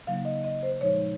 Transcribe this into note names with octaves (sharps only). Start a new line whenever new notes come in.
C#3 F#3 A#3 D#4 F5
D#5
D#5
C5
A#2 F3 G#3 D#4 C#5